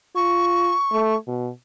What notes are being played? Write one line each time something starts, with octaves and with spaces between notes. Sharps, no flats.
F4 C#6
A3
B2